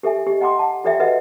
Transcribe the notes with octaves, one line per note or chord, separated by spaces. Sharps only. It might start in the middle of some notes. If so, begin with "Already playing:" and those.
G4 A4 E5 G#5
G4 D#5
D#5 F#5 G5 A#5 C6 D6
F#5 A5
F4 G4 A4 D5 E5 G5
F#4 A4 B4 D#5 E5 F#5